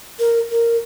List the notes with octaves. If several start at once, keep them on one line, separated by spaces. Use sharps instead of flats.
A#4
A#4